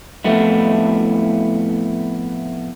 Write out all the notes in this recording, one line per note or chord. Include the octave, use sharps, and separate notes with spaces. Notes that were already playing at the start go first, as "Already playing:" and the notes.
F2 A2 A3 B3 E4